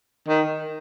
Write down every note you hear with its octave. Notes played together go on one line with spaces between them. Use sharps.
D#3